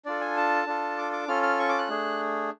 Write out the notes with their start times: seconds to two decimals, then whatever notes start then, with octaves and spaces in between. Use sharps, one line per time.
0.05 D4 F4 A4 D5
0.21 G#5
0.37 A5
0.66 D4 F4 A4
0.98 D6
1.13 D6
1.28 C#4 F4 A4 F6
1.43 F6
1.59 C#6
1.69 D6
1.78 F#6
1.89 A3 D4 G#4